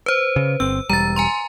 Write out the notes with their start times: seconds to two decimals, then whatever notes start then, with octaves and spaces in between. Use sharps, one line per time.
0.06 B4 C5
0.36 C#3
0.60 G1 C4 E6
0.90 E1 G3 A#5 A6
1.16 G#5 A#5 C6